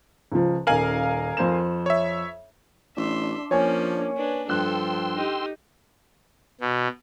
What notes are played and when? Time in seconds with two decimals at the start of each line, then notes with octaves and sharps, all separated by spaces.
0.32 C#2 F3
0.67 D#1 A#4 F5 G#5 F#7
1.37 F2 C5 E7
1.86 C#5 E5
2.97 A1 D4 E5 C6
3.51 F3 A#3 C#4 C#5 G#5
4.16 D4 B4
4.49 G2 F3 A4 G5 C6 E6 F#6
5.16 D#4 G4
6.61 B2